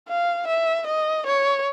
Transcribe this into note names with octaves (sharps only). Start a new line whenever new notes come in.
F5
E5
D#5
C#5